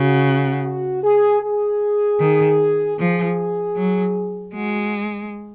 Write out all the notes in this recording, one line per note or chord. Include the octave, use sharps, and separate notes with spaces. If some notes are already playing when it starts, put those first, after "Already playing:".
Already playing: C#3 F#4
F#4
G#4
G#4
D#3
F3 G#4
F#3
G#3 F#4